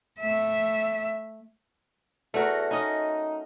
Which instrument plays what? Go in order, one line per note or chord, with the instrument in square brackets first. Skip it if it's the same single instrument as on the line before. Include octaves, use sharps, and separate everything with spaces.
[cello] A3 E5
[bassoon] E2 [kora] A3 F#4 A#4
[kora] C#4 D#5 [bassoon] D#4